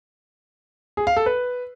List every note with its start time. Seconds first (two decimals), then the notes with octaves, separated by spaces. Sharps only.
0.97 G#4
1.07 F5
1.17 A4
1.26 B4